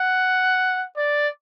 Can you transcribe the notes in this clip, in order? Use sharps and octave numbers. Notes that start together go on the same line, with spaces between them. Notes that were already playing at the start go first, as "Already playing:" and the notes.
Already playing: F#5
D5